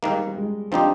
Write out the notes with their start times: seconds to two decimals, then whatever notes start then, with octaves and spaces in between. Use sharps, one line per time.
0.03 G#2 D#3 G3 A#3
0.37 G#3
0.71 F3 C4 D4 D#4 G4